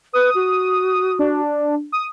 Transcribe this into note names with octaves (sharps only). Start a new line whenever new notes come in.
B4 D#6
F#4
D4
D#6